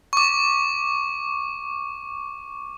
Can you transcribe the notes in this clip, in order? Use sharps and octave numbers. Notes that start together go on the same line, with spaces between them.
C#6 D6